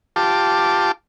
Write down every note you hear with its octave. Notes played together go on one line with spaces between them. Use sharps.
F4 G4 A5 D6